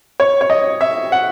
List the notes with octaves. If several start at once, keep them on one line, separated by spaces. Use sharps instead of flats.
C#5
C#5
D#5
E5
F#5